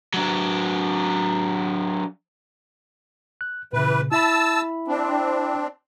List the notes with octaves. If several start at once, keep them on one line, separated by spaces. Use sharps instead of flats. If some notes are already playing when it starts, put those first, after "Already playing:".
F#3 D4
F#6
A#2 C#3 E3 B4
E4 E5 A5 B5 E6
C4 D4